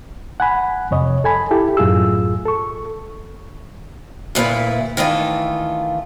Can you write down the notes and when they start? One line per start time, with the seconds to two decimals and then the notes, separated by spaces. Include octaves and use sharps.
0.40 F#5 G#5 B5
0.91 F2 C3 C#5 D#5
1.24 A4 G#5 B5
1.51 E4 G4 A4
1.77 F#2 A2 F4 G#4 E6
2.46 A4 C#6
4.35 D2 A#2 E4 B4
4.97 D#3 E3 A3 F4